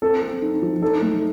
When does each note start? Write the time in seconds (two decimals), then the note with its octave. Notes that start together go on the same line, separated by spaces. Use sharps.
0.02 C4 A4
0.22 C4
0.42 D#4
0.62 F3
0.82 D#4 A4
1.02 A3